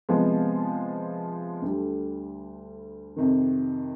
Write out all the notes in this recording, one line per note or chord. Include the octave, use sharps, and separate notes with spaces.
C3 F3 G#3 B3
D2 D3 G3
F2 C3 D#3